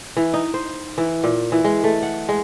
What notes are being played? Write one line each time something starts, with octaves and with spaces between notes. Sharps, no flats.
E3
D#4
C5
E3
A#2
E3
G#3
A3
F#5
G#3